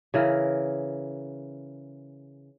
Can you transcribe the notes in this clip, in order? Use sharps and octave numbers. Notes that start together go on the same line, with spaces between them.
C#3 E3 A#4